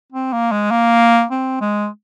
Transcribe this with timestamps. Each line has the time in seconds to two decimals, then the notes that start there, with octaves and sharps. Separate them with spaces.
0.12 C4
0.33 A#3
0.52 G#3
0.71 A#3
1.31 C4
1.61 G#3